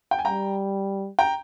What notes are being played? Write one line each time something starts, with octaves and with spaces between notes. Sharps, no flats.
G5
G#5
G3 G5 A#5
G5 A#5